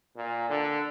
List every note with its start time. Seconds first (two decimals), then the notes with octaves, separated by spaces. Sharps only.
0.16 A#2
0.50 D3